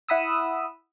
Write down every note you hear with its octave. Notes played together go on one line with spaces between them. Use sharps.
E4 F#5 B5 D#6 E6